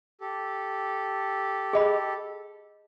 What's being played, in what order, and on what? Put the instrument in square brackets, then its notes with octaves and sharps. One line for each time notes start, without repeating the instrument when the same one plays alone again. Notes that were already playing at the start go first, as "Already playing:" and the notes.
[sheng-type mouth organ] G4 A4
[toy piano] G#4 D#5 B5